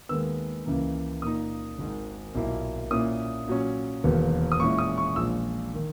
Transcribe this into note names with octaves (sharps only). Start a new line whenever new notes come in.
D#2 D#3 G#3 B3 E6
C#2 C#3 E3 A#3
A#2 A#3 D#4 D#6
G#1 G#2 D#3 G#3
B1 A#2 A#3 E4
A#2 A#3 C#4 E4 D#6
A#2 F#3 C#4
E1 D#2 D#3 F#3 B3
D#6
A#2 G#3 C#4 E4 C#6
D#6
C#6
A#1 A#2 G#3 E6
D#3